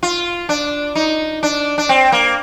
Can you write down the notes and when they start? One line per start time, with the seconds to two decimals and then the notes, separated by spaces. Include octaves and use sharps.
0.03 F4
0.49 D4
0.95 D#4
1.43 D4
1.78 D4
1.89 C4
2.12 A#3